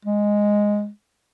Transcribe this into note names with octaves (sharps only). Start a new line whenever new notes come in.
G#3